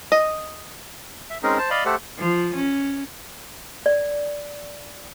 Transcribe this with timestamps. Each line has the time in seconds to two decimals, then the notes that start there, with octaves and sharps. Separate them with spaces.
0.12 D#5
1.30 E5
1.43 G#3 C4 C#4 D#4 G#4 A#4
1.58 C5 A5
1.70 D5 D#5 F5 B5
1.85 A3 G4 A4 C5 F#5
2.18 F3
2.54 C#4
3.86 D5